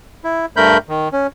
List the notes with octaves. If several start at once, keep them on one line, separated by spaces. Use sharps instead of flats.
E4
G2 A3 A#4 B5 G6
D#3
C#4